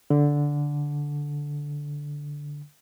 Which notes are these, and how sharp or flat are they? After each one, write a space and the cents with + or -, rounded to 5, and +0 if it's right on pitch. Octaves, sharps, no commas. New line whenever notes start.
D3 -10